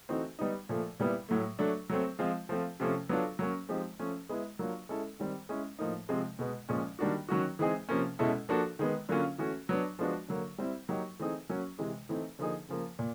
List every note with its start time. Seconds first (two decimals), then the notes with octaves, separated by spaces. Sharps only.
0.09 E3 A3 C4 D#4 F#4
0.39 G3 B3 D#4
0.69 A#2 F3 A3
0.99 A#2 G3 B3 E4
1.29 A2 F#3 A3
1.59 F#3 A3 D4
1.90 F#3 A3 C4
2.19 F3 G#3 C4 F4
2.49 F3 A3 C4 F4
2.80 C3 F3 A3 C#4
3.09 F#3 B3 D4 F4 A4
3.39 F#3 A#3 C#4
3.69 F3 G#3 C4 D#4 G4
3.99 F3 A3 C#4
4.29 G#3 B3 E4
4.59 F#3 A#3 D4 F4
4.89 G#3 C#4 E4 A4
5.20 D#3 G3 C4
5.49 G#3 C#4 E4
5.79 A2 F3 A#3 D#4
6.09 C3 F3 G#3 C4
6.39 B2 G#3 B3
6.69 A#2 F3 G#3 C#4
6.99 D#3 G3 A#3 D4 F#4
7.29 D#3 F#3 A#3 C#4 F#4
7.59 E3 G#3 C4 D#4 G#4
7.89 C3 F3 A#3 C#4
8.19 B2 G#3 C#4 E4 A4
8.49 F3 A#3 D4 F#4 A4
8.79 D#3 G#3 B3
9.09 D3 F#3 A#3 C#4 F4
9.38 E3 A3 C#4 F#4
9.69 F#3 B3 D4
9.99 F3 G#3 B3 D4 F#4
10.28 D3 F#3 A#3
10.58 G3 C4 E4
10.89 F#3 A#3 D#4 G4
11.19 E3 A3 C4 D#4 G#4
11.49 F#3 A#3 C#4 F#4
11.79 C3 E3 G#3
12.09 E3 A3 C4 D#4
12.39 D3 F3 A#3 D#4 G#4
12.69 C#3 F3 A#3
12.99 A#2